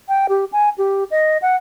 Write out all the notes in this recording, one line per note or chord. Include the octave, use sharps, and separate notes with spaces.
G5
G4
G#5
G4
D#5
F#5